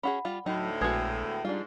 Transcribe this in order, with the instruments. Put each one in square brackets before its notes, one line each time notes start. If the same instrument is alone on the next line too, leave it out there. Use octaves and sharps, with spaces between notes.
[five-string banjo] C#4 F#4 G#4 [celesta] F#5 B5
[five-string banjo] G3 F4
[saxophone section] D2 A2 [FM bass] F#3 [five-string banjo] D#4
[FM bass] A#1 [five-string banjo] G#3 B3 F#4 [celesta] B4 D#6 G#6
[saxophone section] G#2 [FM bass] G3 [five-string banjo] D4 F4